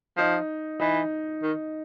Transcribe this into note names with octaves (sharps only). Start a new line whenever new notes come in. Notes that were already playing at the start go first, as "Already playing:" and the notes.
F3 D#4
E3 D#4
D#3